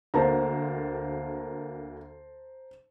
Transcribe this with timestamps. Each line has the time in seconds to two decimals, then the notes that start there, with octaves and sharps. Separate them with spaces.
0.14 D2 A#3 C5 A5 A#5